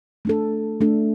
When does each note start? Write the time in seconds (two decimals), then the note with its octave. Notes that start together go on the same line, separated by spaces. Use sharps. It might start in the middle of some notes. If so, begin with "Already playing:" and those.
0.25 A3 D4 A4
0.81 A3 D4 A4